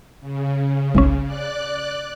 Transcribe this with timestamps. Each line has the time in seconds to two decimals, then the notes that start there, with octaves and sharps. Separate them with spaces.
0.20 C#3
0.95 G1 C2 C#4
1.25 D5 F#6